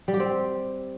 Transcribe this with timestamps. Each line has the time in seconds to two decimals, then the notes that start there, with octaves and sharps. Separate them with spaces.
0.08 G3
0.14 G4
0.20 C4